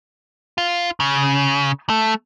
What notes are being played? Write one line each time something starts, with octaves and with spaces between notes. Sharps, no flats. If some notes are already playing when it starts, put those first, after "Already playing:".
F4
C#3
A3